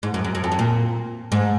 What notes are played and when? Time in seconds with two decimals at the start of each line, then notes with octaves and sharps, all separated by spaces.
0.03 G#2
0.14 F#2
0.25 F#2
0.35 F#2
0.44 F2
0.52 F#2
0.59 A#2
1.32 G#2